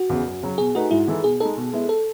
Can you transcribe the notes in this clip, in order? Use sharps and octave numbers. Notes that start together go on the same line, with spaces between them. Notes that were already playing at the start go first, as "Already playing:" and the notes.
Already playing: F#4
E2 C#3
F#2
C#3 F#3
B2 G#4
A3 D#4 F#4 G#4 B4
G#2 E4
E3 G#3 D#4 A4
B2 G#4
G#3 D#4 A4
B2
G#3 B3 E4
A4